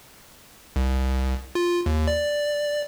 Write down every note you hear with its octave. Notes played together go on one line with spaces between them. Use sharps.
C2
F4
D#2
D5